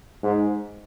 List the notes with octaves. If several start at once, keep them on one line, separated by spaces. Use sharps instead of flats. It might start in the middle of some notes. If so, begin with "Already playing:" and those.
G#2